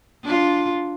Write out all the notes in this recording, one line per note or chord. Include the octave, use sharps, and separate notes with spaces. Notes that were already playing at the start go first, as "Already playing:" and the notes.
D4 F4